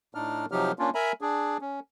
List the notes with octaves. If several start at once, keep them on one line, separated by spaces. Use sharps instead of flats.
A2 D4 D#4 F6
C3 F3 F#3 D#4 G4 F6
A#3 C#4 D4 F4
A#4 E5 G#5 A#5 B5
D4 G#4
C#4